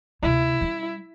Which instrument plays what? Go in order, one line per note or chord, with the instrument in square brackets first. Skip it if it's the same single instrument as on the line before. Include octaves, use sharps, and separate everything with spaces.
[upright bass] D2 C3 [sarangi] E4
[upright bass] G3 C#4